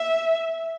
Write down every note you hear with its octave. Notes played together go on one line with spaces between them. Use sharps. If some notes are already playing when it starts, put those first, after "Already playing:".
Already playing: E5